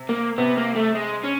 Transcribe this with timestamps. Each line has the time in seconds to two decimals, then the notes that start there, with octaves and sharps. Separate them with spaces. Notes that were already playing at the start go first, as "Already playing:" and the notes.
Already playing: C3
0.09 A#3
0.38 C3 B3
0.57 A#3
0.76 A3
0.95 G#3
1.24 C#4